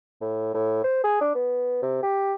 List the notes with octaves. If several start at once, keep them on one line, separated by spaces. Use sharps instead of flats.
A2
A2
C5
G#4
D4
B3
C3
G4